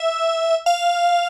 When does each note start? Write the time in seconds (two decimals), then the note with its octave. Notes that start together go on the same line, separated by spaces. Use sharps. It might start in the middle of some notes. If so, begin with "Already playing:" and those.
Already playing: E5
0.66 F5